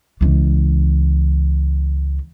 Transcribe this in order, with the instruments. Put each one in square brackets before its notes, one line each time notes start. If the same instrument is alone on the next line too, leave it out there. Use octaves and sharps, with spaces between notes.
[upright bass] C#2 E3